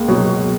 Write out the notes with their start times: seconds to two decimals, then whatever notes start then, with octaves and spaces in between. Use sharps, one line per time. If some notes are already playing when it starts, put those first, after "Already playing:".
Already playing: C#2 A#3
0.08 B2 F#3